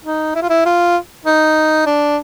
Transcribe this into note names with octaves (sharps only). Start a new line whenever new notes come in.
D#4
E4
F4
E4
F4
D#4
D4